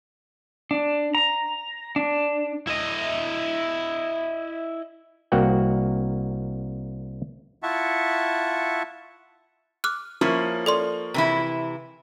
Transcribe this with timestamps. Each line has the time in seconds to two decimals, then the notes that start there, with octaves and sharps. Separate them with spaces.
0.71 D4
1.15 A#5
1.96 D4
2.67 E4 D#5
5.32 C2 A#3 F#4 F#5 G5
7.63 E4 F4 E5 F#5 A5 C#6
9.84 D6 F6 F#6
10.21 F3 A#3 C#4 E4 C#6
10.66 A4 D5 C6
11.14 C3 E3 E4